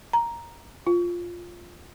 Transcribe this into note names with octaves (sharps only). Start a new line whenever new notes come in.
A#5
F4